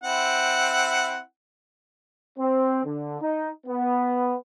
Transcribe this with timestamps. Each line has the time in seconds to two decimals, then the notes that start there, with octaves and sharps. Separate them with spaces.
0.04 C4 E4 F#5
2.39 C4
2.85 D3
3.21 D#4
3.67 B3